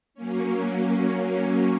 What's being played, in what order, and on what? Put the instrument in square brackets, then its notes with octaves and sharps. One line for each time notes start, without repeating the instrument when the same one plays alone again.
[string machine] F#3 A#3 C#4